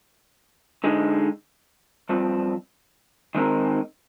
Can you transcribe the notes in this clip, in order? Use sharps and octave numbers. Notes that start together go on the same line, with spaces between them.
D3 G#3 D#4
G2 F3 C4
D#3 G#3 C4 D#4 A#4